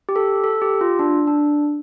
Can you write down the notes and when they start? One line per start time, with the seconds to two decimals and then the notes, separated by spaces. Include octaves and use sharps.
0.09 G4
0.16 A4
0.44 A4
0.62 G4
0.81 F4
0.99 D4
1.27 D4